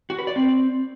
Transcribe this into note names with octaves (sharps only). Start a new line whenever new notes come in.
F#4
B4
D5
C4